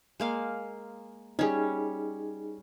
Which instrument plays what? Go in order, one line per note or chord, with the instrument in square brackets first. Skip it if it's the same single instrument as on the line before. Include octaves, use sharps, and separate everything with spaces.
[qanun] G#3 A#3 F5
[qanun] G3 C#4 [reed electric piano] D#4 G#4